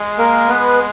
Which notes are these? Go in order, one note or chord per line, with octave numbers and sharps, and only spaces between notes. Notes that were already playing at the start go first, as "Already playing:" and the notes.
Already playing: G#3
A#3 A#4
B3 B4